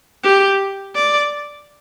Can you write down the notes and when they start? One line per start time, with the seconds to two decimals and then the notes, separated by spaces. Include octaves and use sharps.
0.24 G4
0.96 D5